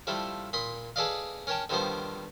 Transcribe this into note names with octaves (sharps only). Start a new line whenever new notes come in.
F3 G3 A3 E4 F4
A#2 B5 C6 D#6
G#4 A4 B4 D5 D#5 F5
C#4 A#4 C#5 G5 A5
D3 D#3 F3 G3 B3 C5